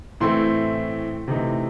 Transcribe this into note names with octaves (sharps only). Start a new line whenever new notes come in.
A2 E3 A3 C4 C6
C3 E3 A3 D#4